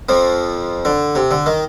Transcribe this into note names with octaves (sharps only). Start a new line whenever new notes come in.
F2 F3
D3
C3
D3
D#3